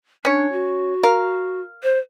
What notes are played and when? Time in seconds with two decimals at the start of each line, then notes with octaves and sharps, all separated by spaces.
0.25 C#4 D4 C#5
0.52 F#4
1.03 A#4 F5
1.83 C5